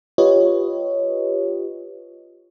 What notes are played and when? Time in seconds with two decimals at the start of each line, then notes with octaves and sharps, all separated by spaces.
0.18 F4 G4 B4 C#5 D#5